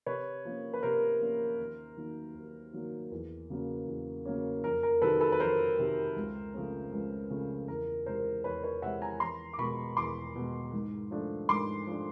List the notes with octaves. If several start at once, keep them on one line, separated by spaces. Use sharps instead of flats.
C3 B4 C#5
F3 A#3 C#4
B4
C3 A#4 C5
F3 A#3 C#4
D#2
D#3 F#3 A#3
D#2
D#3 F#3 A#3
E2
C#3 F#3 A#3 C#4
E2
C#3 F#3 A#3 C#4
F2 A#4
A#4
C3 D#3 F#3 A4 B4
A4 B4
B4
F2 A#4 C5
C3 D#3 F#3
C#2
C#3 F3 A3 C4
C#2
C#3 F3 A3 C4
E2 A#4
C3 E3 G#3 C4 A#4 C5
E2 B4 C#5
B4 C#5
C3 E3 G#3 C4 E5 F#5
G#5 A#5
E2 A#5 C6
D6
B2 G#3 B5 C#6
E2 C6 D6
B2 G#3
G#2
F3 A3 D4
G#2 C6 D6
F3 A3 D4